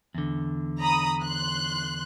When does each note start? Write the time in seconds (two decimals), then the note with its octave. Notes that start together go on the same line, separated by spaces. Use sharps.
0.15 E2 D3
0.79 A#5 B5 D#6
1.21 C6 F#6